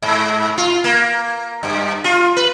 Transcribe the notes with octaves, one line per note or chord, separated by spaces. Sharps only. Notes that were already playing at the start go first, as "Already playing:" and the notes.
G#2
F4
A#3
G2
F4
B4